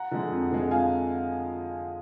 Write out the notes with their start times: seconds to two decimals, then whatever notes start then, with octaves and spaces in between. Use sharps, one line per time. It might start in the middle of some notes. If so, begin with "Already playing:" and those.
Already playing: F#5 A#5
0.11 D3 F3 G#3
0.31 F2
0.52 D3 F3 G#3
0.71 F2 F5 G#5